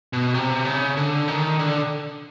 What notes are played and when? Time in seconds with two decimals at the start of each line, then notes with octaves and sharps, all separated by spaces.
0.13 B2
0.34 C3
0.65 C#3
0.97 D3
1.28 D#3
1.59 D3